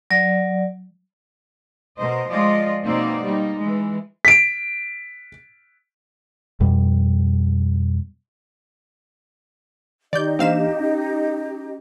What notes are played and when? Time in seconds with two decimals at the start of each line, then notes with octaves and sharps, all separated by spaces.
0.10 F#3 D5
1.98 B2 A#4 C5 D#5
2.30 F3 G#3 F4 C5 D5 D#5
2.84 B2 A#3 C4 D#4 C5 D5
3.23 G3 A#3 D#4
3.59 E3 G#3
4.25 B6 D7
6.60 F2 B2 G3
10.13 D#3 D#4 G4 D5 D#5 G6
10.39 E3 A#3 C4 D4 F5 E7
10.80 C#4